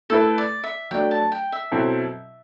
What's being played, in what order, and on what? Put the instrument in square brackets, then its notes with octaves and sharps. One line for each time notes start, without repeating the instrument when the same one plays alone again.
[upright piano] A3 E4 B4 [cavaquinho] A4
[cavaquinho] D5
E5
[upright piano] F#3 A3 D4 [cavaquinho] G5
[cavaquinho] A5
G5
E5
[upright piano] B2 F#3 C4 E4 A4